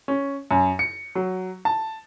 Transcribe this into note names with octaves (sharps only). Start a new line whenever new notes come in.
C#4
F#2
C#7
F#3
A5